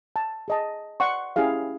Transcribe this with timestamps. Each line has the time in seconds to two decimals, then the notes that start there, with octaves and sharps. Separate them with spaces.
0.16 A5
0.48 G#4 D#5 A5
1.00 D5 F#5 C6 C#6
1.36 C#4 E4 G4 G#4 F5